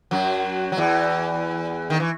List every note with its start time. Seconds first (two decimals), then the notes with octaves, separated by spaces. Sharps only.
0.11 F#2 F#3
0.72 F#3
0.77 E2 E3
1.90 D#3
2.00 E3